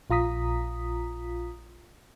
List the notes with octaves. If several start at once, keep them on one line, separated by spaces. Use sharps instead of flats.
A#1 F4 A#5 D#6 B6